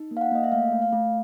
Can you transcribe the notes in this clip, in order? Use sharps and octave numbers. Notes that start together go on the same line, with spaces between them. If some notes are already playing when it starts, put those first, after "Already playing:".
Already playing: D#4
A#3
F5
F#5
A#3 D#5
E5
A3 F5
A3
F5
A3